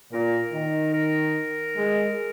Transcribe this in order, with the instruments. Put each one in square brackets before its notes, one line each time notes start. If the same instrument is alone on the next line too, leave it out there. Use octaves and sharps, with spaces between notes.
[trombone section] A#2 [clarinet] A#4
[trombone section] D#3
[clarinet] A#4
[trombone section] G#3